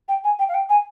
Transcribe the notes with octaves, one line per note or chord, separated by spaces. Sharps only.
G5
G#5
G5
F5
G5
G#5